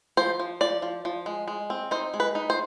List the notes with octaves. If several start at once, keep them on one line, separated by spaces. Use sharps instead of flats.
F3 C5
F3
F3 D5
F3
F3
G#3
G#3
C4
D#4 C5
G#3
B4
D#4
C5